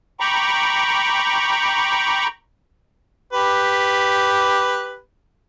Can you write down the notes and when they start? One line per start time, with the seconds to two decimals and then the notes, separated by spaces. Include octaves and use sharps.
0.20 G5 A#5 B5 C#6 D6
3.33 G4 B4